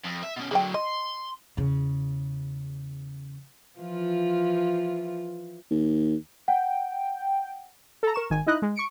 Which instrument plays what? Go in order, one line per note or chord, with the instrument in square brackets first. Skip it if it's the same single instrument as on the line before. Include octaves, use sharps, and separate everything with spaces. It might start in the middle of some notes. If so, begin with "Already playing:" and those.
[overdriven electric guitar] F2
E5
B2 C#4
[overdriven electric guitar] D3 F#3 [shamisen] G#4 D5 G5
[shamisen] D#5 [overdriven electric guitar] C6
[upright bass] E2 C#3
[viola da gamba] E3 F3 F4
[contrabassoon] D#2
[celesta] F#5 [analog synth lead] G5
[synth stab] A4 A#5
A#4 C#6 E7
G#1 D#3 G#5
D#4 E4 D#5 F#6
G#3
C#6 C#7 D7